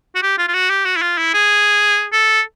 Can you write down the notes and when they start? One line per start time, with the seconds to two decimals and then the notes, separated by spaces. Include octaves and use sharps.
0.15 F#4
0.22 G4
0.38 F4
0.48 F4
0.54 F#4
0.70 G4
0.85 F#4
0.96 E4
1.02 F4
1.18 E4
1.34 G#4
2.12 A4